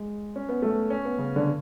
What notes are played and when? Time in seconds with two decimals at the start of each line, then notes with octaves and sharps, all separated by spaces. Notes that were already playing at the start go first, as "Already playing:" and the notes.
Already playing: G#3
0.36 C#4
0.49 B3
0.62 A3
0.90 C#4
1.05 B3
1.18 C#3
1.36 D3